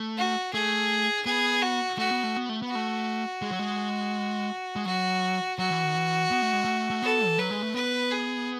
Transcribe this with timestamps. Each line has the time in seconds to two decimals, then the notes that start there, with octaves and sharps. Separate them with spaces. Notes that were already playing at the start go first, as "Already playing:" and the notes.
Already playing: A3
0.17 F#4
0.53 A3 G#4
1.25 B3 G#4
1.62 F#4
1.98 A3 F#4
2.11 B3
2.23 A3
2.37 B3
2.49 A3
2.62 B3
2.69 F#4
2.75 A3
3.42 G#3
3.52 F#3
3.59 G#3
4.76 G#3
4.86 F#3 F#4
5.58 F#3 F#4
5.71 E3
5.84 D#3
5.96 E3
6.31 B3
6.42 A3
6.53 G#3
6.65 A3
6.90 A3
7.03 B3 A4
7.27 E3
7.38 F#3 B4
7.50 G#3
7.62 A3
7.74 B3 B4
8.11 G#4